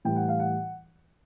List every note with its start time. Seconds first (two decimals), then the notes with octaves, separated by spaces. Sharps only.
0.05 A2 E3 G3 G5
0.16 F#5
0.28 F5
0.39 F#5